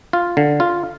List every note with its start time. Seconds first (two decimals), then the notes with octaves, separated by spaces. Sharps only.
0.13 F4
0.37 D3
0.60 F4